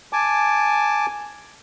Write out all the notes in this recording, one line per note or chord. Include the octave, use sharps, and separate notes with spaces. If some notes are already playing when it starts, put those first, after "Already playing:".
G#5 A5 D6